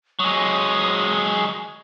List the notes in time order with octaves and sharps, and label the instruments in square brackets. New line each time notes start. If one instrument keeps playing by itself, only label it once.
[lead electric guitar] F#3 G#3 [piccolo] D#6